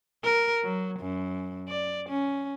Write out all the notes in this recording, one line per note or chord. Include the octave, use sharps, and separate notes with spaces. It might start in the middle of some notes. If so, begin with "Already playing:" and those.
A#4
F#3
F#2
D5
C#4